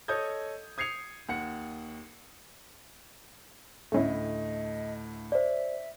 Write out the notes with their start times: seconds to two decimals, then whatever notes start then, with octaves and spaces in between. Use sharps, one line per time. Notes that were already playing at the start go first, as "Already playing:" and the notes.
0.08 A4 C#5 D#5 D#6 G6 G#6
0.78 D#6 G#6 C7 C#7 F7
1.29 D#2 F#5 C#7
3.92 D2 A2 A3 C#4 E4 D#5
5.32 C5 D5 E5